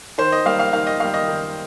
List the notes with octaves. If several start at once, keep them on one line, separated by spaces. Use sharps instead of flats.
D#3 C5
D#5
G3 A#3 F5
F5
D#3 F5
D#5
G3 A#3 F5
D#5
D#3